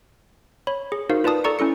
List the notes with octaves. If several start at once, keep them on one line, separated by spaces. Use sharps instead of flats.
C#5 B5
G#4
D#4 F#4 A#4 C5 F5
F4 B4 D5 A5 D#6
A4 D5 A#5 C#6 C#7
C#4 E4 A4 C#7